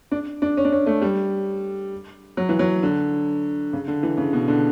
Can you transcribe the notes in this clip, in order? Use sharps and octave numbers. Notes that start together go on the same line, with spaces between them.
D4
D4
C#4
D4
C#4
A3
G3
F#3
E3
F#3
D3
C#3
D3
E3
C#3
B2
D3